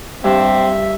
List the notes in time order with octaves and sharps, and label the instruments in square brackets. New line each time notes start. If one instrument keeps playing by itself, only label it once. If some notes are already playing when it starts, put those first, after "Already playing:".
[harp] G2 [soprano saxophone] C4 [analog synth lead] E5